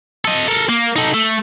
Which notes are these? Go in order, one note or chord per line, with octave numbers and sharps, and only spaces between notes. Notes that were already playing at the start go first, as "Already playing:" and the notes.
A4 D#5
A4 A#4
A#3
D#4 A4
A3